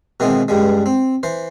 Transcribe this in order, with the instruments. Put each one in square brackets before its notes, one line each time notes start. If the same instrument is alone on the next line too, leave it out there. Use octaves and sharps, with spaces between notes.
[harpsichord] B2 D#3 E3 G#3 B3 C4
C#2 G2 G3 G#3
C4
E3 C5